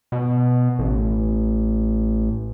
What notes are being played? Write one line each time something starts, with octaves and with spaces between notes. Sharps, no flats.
B2
A1